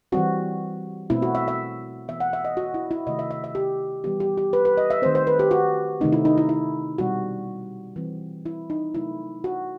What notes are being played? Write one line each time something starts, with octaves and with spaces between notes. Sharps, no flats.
E3 G3 C4 F#4
B2 A3 C4 E4
F#4
E5
E5
E3 B3 E5
F#5
E5
D#5
F#4
E4
E4
C3 D#3 A3 D#5
E5
E5
E5
G4
E3 G3 B3 G4
G4
G4
B4
B4
D#5
E5
D#3 A3 C4 C5
C5
B4
G4
F#4
C3 D#3 A3 C4 D#4
E4
D#4
E4
E4
B2 G3 C4 F#4
E3 G3 C4
E4
D#4
C3 F#3 A3 E4
F#4